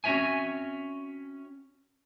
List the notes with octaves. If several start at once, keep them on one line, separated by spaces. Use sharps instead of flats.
C4 C#4 F#4 C#5 E5 G#5